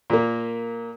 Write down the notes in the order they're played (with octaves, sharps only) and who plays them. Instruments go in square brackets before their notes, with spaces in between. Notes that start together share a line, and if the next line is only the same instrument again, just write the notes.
[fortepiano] A#2 A#3